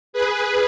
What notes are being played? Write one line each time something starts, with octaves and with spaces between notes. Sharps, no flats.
G#4 B4